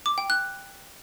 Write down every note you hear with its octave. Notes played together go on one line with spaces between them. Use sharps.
D6
G5
F#6